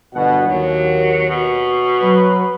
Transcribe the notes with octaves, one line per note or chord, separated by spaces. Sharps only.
G1 B2 F#5
D#2 F#3
B2
F#3 B4